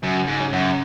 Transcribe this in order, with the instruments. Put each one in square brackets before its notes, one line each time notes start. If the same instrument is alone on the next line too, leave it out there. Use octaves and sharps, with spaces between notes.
[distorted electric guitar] F#2 [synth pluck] C#3
[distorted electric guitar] G#2
[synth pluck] C#4
[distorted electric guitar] F#2